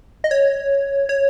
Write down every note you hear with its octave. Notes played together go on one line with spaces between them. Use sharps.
D#5
C#5
C#5